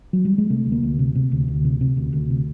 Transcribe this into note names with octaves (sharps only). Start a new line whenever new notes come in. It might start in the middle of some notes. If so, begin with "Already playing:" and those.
F#3
G3
G#3
C3 A3
D2
A#3
D2
C3
C3
D2
D2
C3
C3
D2
D2
C3